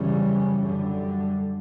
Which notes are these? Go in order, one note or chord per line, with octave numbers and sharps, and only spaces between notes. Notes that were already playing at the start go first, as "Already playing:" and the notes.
Already playing: F#2 C#3 E3 G3 C#4
F#2 D3 G3